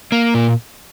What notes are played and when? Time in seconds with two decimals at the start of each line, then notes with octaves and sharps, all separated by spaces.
0.12 A#3
0.34 A#2